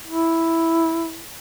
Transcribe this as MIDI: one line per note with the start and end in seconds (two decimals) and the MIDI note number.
0.07 1.21 64